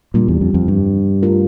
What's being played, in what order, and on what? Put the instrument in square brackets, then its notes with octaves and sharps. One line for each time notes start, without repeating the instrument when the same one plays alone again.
[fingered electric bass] A#2 [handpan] C#3 G3 D4
[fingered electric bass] E2
F2
F2
G2
[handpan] A3 D4 F4 A#4